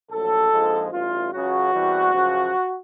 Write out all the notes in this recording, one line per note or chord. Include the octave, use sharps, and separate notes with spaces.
A#1 A2 F#3 A4
A#1 G#2 F3 G#3
A1 G2 E3 F4
C#2 C#3 F#3 F#4
E2 C3 E3 G3
F#2 C#3 F3